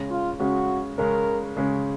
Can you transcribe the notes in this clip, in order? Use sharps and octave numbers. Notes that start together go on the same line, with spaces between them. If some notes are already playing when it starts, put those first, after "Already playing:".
Already playing: C#3 G#3 C#4
F4
C#3 G#3 C#4 F#4
C#3 G#3 C#4 A#4
C#3 G#3 C#4